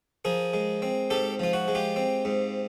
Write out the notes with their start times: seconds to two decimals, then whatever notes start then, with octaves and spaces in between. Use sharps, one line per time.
0.25 F3 G#4 A#4
0.53 G#3
0.82 C4
1.10 G#2 G4 A4
1.40 F3 F4
1.53 F#4
1.68 G#3
1.75 F4 G4
1.96 C4
2.25 G#2